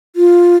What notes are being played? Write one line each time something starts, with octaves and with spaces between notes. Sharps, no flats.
F4